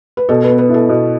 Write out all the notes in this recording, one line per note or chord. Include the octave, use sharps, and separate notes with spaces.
B4
B2 A4
B4
B3
B4
E4
A4
B2